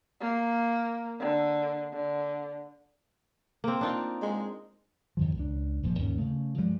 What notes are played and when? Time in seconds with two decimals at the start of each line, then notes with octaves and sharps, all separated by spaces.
0.21 A#3
1.20 D3
1.93 D3
3.64 A#3 C4
3.81 D4 D#4 F4
4.22 G#3
5.17 F2 D#3 F3
5.37 C#2 D4
5.83 D#1 A#2 F3
5.99 D#2 G#2 C#4
6.19 C#3 A3
6.57 G2 F3 G3 G#3